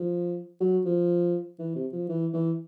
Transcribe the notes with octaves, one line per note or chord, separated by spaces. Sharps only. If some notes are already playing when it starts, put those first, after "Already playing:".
Already playing: F3
F#3
F3
E3
C3
F3
E3
E3